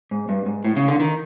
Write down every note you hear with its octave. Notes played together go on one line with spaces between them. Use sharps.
G#2
G2
G#2
A2
C#3
D3
D#3